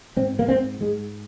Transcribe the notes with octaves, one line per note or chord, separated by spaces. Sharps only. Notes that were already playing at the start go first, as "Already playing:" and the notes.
G#2 C4
A#3
G#2 C4
G#2 G#3